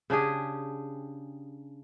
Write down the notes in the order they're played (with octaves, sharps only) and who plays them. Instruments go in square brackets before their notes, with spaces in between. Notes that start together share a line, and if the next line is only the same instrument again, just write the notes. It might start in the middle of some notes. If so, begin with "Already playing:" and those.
[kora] C#3 D4 G4 G#4